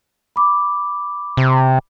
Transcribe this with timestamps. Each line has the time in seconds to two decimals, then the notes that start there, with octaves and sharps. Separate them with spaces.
0.36 B5 D6
1.37 C3